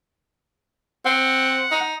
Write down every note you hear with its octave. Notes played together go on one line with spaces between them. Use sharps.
C4 F#5
D#4